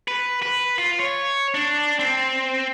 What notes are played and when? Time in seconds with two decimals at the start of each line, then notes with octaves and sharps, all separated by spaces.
0.08 B4
0.43 B4
0.78 F4
0.99 C#5
1.54 D4
1.99 C4